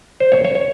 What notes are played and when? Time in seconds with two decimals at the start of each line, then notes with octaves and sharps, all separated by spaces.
0.20 C5
0.32 C#5
0.45 C#5
0.55 C#5